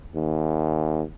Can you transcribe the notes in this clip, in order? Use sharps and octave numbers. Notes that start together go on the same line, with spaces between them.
D#2